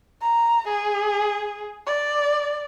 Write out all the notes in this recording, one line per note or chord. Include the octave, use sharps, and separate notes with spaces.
A#5
G#4
D5